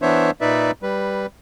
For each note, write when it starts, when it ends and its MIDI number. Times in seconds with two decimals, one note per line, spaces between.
0.02 0.31 52
0.02 0.31 59
0.02 0.31 62
0.02 0.31 72
0.02 0.31 73
0.02 0.31 76
0.41 0.71 46
0.41 0.71 63
0.41 0.71 71
0.41 0.71 74
0.41 0.71 76
0.83 1.26 55
0.83 1.26 71